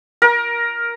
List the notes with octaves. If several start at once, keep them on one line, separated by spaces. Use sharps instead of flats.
A#4